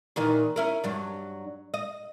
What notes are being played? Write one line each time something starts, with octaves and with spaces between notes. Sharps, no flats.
A#2 D#3 E3
C#4 E4 A#4
G2 F#3 D4
D#5